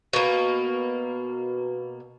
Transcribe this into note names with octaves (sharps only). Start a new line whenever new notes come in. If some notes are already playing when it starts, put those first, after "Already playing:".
B2 A#3